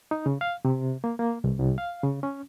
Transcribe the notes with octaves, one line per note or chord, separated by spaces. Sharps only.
D#4
C#3
F5
C3
A#3
A#3
C2
C2
F5
C#3
C#4